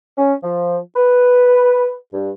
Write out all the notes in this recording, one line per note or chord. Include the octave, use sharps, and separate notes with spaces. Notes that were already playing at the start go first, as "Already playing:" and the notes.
C#4
F3
B4
G2